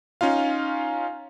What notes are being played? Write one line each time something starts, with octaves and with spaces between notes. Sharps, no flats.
C#4 D#4 F4 F5